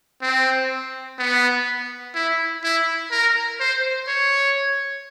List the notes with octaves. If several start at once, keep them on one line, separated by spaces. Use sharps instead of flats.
C4
B3
E4
E4
A#4
C5
C#5